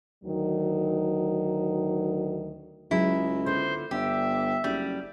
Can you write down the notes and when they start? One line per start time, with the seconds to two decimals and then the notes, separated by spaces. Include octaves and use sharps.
0.23 D2 D#3 F#3
2.91 C#2 F#3 E4 G#4
3.46 D3 B3 F4 C5
3.91 G1 G4 D5 E5
4.64 F#1 G3